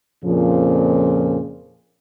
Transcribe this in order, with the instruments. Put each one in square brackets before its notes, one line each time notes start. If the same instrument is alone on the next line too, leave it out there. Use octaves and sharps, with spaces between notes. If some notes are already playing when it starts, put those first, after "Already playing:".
[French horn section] F2 A#2 C#3 F3